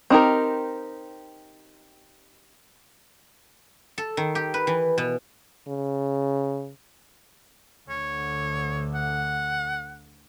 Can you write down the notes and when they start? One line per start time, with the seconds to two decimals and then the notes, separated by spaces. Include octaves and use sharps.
0.10 C4 D#4 G4 A#4
3.98 A4
4.17 D#3
4.35 G4
4.54 B4
4.67 E3
4.98 B2
5.68 C#3
7.89 D2 D3 C#5
8.95 F#5